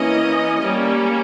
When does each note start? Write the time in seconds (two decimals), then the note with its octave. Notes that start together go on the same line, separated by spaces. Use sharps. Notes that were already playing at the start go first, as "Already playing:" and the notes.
Already playing: E3 A#3 C#4 D#5
0.61 G3 A#3 C#4